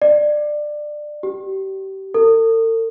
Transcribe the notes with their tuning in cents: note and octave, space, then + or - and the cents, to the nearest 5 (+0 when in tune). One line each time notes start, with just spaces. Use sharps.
D5 +20
G4 -30
A4 +45